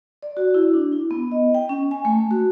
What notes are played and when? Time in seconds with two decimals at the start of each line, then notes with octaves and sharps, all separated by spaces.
0.23 D5
0.37 F#4
0.54 E4
0.74 D4
0.92 E4
1.11 B3
1.32 D#5
1.55 G5
1.69 C#4
1.91 G#5
2.05 A3
2.31 F#4